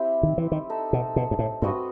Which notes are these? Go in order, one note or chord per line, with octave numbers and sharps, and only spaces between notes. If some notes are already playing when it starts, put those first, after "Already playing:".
Already playing: C4 E4 G4
D#3
E3
D#3
D#4 A4 E5
B2
B2
G2
A2
G2 C4 F#4 B4 D#5